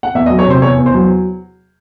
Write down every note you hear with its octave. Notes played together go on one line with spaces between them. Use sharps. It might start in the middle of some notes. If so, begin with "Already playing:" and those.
F#5
E2 E5
D#5
F#3
C#5
C3 C5
E2 C#5
E2
C5
F#3